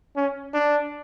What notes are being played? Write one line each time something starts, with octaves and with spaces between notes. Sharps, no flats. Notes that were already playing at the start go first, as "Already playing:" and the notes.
C#4
D4